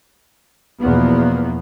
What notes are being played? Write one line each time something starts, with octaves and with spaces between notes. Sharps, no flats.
E2 B2 F3 A#3 B3